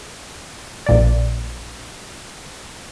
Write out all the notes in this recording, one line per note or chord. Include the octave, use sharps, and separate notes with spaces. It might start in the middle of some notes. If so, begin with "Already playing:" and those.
A#1 A#2 D5